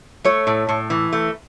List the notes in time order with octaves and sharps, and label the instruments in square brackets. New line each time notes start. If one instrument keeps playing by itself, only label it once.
[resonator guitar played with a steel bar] A3 [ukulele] C#5
[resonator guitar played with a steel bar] A2
A2
E3
A3